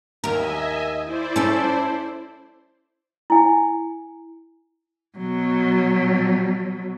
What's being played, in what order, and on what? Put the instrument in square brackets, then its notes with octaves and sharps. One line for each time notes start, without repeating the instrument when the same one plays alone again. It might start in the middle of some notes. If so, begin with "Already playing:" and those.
[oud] D#2 A#4 [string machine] D#5 E5 G#5
[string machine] E4 C5 D5
[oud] C#4 A4
[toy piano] E4 G#5
[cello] B2 F#3